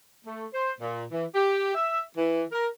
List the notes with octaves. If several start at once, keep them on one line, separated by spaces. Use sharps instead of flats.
A3
C5
A#2
E3
G4
E5
E3
A#4